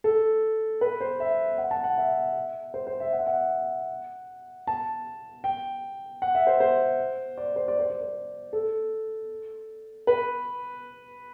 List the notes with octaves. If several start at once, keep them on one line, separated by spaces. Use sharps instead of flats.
A4
B4
C5
E5
F#5
A5
F#5
E5
C5
C5
E5
F#5
E5
F#5
A5
G5
F#5
E5
C5
C5
D5
C5
D5
C5
D5
C5
A4
B4